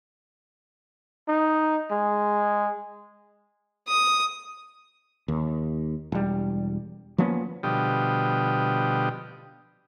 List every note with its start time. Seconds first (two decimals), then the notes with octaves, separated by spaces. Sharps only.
1.28 D#4
1.91 G#3
3.88 D#6
5.28 D#2
6.12 E1 G3
7.18 F3 A#3 B3 C#4
7.63 B2 D3 F3 G3 G4 D#5